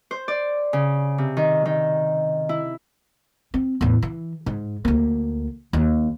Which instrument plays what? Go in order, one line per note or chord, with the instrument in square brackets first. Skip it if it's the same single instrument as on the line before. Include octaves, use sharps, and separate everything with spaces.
[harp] C5
D5
C#3
C3
D#3
D#3
E4
[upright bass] C4
E2 A2
E3
G#2
D2 A#3
D#2